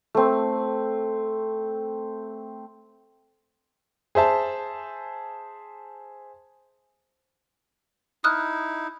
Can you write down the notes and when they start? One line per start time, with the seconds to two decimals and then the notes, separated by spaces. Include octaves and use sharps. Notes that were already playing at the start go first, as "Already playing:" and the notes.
0.15 A3 C4
4.15 G#4 C5 E5 A5
8.24 D#4 E4 D#6 F6 F#6